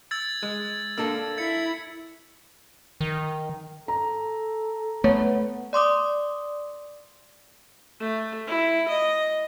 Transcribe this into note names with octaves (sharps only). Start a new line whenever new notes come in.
E6 G#6 A6
G#3
A#3 D4 A4 E6
E4 G#6 C#7
D#3
A4 A#5
A3 B3 C#5
D5 C6 D6 D#6
A3
E4
D#5